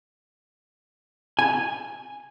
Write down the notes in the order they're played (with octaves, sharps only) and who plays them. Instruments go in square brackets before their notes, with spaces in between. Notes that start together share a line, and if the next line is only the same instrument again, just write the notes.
[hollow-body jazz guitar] G#5